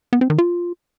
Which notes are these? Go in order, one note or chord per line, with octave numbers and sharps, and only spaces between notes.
B3
C4
D#3
F4